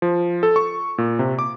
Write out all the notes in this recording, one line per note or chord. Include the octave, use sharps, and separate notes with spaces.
F3
A4
C#6
A#2
C3
D6